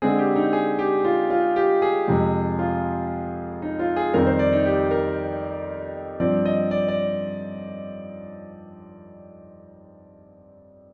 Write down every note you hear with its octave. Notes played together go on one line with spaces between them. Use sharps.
D3 G#3 C4 G#4
G4
D#4
G#4
G4
F4
F4
G4
G#4
F2 C3 F3 G#3
F4
D#4
F4
G#4
F2 D#3 G3 C4 A#4
C5
D5
D#4
G4
A#4
G2 F3 C4 D5
D#5
D5
D5